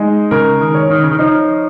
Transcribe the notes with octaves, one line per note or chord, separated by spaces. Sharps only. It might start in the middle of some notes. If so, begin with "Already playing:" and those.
Already playing: G#3 D#4
C#3 A#4
D#3
C#5
D#3
C#3
D#3
F3 D#4